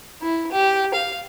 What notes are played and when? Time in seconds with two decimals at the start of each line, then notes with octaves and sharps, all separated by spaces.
0.21 E4
0.52 G4
0.94 F5